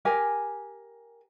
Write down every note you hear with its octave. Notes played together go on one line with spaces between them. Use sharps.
G4 A#4 G#5